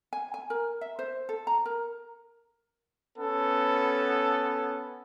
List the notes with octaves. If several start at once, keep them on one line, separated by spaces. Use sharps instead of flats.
G#5
G#5
A#4
E5
C5
A4
A#5
A#4
B3 C#4 A4